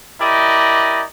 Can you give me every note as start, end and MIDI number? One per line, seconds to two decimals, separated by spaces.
0.20 1.04 64
0.20 1.04 67
0.20 1.04 70
0.20 1.04 74
0.20 1.04 75